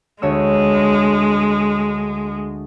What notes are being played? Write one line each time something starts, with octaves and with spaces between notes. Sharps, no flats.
D2 G#3 C#5 E6